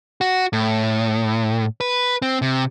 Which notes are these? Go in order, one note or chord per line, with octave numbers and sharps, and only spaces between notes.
F#4
A2
B4
C4
C3